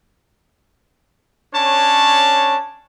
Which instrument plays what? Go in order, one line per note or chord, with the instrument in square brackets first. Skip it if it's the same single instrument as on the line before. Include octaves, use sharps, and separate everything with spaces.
[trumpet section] C#4 D4 C#5 A5